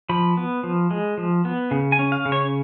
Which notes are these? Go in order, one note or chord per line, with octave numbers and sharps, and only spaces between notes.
F3 B5
B3
F3
G#3
F3
B3
C#3
G#5
C#4
F5
C#3
C#5